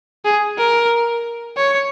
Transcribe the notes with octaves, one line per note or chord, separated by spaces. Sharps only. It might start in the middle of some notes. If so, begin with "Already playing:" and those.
G#4
A#4
C#5